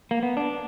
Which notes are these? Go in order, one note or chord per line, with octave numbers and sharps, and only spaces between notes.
A#3
B3
D4